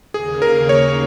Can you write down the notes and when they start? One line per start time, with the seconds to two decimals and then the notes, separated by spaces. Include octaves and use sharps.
0.14 D#2 C#3 A#3 G#4
0.42 A#4
0.69 C#5